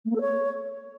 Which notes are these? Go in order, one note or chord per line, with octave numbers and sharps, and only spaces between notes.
A3
A#3
A4
C#5